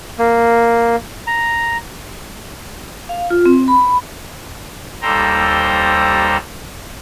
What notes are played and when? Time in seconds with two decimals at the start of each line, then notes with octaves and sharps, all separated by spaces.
0.19 A#3
1.27 A#5
3.09 F5
3.30 F4
3.46 C4
3.68 B5
5.02 D#2 G3 A4 C5 G5 A#5